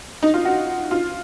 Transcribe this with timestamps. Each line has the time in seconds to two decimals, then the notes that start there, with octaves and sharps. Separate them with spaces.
0.23 D#4
0.34 F4
0.45 F#4
0.91 F4